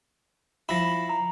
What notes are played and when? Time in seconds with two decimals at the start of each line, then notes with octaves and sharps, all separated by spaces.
0.69 F3 E4 B5 A#6
1.09 A#5